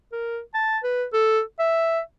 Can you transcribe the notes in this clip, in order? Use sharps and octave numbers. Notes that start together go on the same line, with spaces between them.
A#4
A5
B4
A4
E5